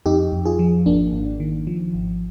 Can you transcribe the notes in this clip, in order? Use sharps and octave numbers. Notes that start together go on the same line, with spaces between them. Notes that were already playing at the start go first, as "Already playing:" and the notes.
F2 D#4 G4
F2
F4 G#4
F3
G#1 A#3 D4
G#1
D#3
F3
G#1